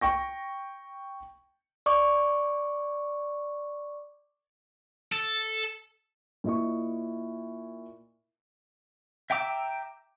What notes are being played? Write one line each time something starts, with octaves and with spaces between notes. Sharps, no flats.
G5 C#6 A#6
D5 C#6 D6
A4
A#2 E4 D#5 C#6
E5 G5 A#5 D6 E6